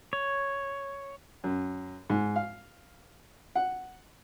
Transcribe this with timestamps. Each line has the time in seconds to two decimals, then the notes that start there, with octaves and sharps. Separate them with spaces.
0.13 C#5
1.44 F#2
2.10 G#2
2.36 F5
3.56 F#5